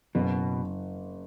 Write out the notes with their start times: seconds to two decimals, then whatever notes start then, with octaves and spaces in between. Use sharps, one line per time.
0.15 F#1 B2